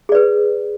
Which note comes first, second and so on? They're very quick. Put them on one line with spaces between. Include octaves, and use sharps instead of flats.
G#4 D5 B4